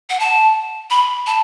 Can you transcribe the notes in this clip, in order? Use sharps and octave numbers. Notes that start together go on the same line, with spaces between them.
F#5
A5
B5
A5